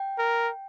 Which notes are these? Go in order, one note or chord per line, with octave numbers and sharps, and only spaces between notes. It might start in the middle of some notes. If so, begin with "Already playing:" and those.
Already playing: G5
A#4